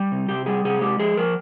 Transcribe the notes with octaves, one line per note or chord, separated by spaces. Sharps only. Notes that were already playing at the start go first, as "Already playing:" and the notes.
Already playing: G3
C3
C3 G4
G3 G#4
C3 G#4
G#3 G4
F3 G#4
F3 A#4